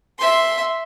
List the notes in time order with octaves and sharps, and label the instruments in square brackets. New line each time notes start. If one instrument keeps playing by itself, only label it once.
[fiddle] E5 C6